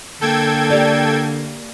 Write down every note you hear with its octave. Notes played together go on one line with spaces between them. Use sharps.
D3 A#3 A4 G5 G#6
G4 D5